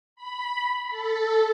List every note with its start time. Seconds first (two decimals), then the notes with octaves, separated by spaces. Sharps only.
0.16 B5
0.88 A4